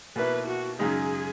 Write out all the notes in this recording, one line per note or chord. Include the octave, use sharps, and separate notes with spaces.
B2 A#3 E4 B4
F#4
F#2 C#3 G#3 D#4 G#4